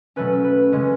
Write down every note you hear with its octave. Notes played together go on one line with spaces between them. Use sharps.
B2 F#3 A3 C#4 B4
B4
C#3 G#3 C#4